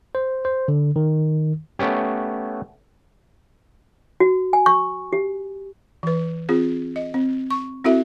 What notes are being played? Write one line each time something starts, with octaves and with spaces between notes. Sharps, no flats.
C5
C5
D3
D#3
A3 B3 C#4 G4
F#4
G#5
C#6
G4
E3 B4
C4 F4 G#4
D#5
C4
C#6
C4 E4 F#4 A4 E5